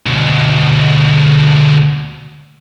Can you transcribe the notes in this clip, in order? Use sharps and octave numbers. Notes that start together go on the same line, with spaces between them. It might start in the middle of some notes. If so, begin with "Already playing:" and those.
D2 B2